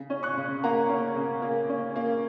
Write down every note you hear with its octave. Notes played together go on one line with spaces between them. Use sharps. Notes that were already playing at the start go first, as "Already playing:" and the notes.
Already playing: C#3
C#4
C#6 F#6
C#3
A#3 F#5 A#5
C#4
C#3
A#3
C#4
A#3